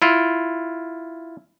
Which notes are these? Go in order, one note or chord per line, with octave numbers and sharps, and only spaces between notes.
E4 F4